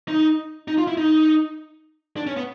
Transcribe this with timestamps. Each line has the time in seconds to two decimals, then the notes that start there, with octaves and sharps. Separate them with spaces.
0.08 D#4
0.68 D#4
0.78 F4
0.87 E4
0.97 D#4
2.17 D4
2.27 C#4
2.37 B3